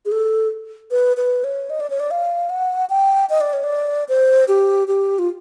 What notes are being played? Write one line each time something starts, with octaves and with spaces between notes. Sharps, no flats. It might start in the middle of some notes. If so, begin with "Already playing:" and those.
G#4
A4
B4
B4
C#5
D#5
D5
C#5
D5
F5
F#5
G5
D#5
D5
C#5
D5
C5
G4
G4
F4